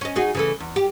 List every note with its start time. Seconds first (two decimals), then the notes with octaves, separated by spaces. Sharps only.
0.01 C#4 D#5
0.16 D#4 F#4 G#4
0.35 C#3 E3 A3
0.60 E2
0.76 G4